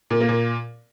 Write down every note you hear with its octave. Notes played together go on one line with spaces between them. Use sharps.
A#2
A#3
A#2